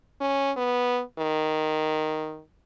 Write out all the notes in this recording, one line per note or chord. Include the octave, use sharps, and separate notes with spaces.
C#4
B3
D#3